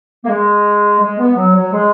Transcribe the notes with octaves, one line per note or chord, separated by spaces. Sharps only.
A#3
G#3
G#3
B3
F#3
F#3
G#3